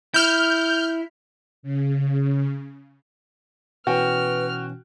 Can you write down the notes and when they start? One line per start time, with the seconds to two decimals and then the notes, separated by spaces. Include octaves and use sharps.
0.14 E4 F6 G6
1.63 C#3
3.87 B2 E3 C#4 F#4 B4 G5 F6